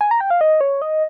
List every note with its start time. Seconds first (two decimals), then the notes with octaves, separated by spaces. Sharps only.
0.01 G#5
0.11 A#5
0.20 G5
0.30 F5
0.41 D#5
0.61 C#5
0.82 D#5